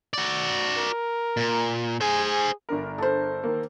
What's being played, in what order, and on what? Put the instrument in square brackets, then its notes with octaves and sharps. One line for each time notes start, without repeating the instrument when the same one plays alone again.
[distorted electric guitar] F#4 D5
[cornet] A#4
[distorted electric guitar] A#2
[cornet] G#4 [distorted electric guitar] C5 G#5
[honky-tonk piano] G1 D4 A#4
[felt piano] A4 C5
[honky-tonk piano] D#3 A#3